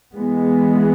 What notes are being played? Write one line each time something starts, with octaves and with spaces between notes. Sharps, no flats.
E3 G#3 B3